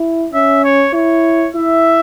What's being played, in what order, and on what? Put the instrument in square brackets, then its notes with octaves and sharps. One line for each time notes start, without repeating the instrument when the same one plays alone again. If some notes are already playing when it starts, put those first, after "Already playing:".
Already playing: [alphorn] E4
[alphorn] C#4 [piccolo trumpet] E5
[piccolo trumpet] C#5
[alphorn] E4 [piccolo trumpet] C#5
[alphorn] E4 [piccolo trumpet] E5